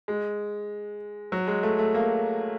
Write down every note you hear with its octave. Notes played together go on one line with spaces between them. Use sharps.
G#3
F#3
G#3
A3
A3
A#3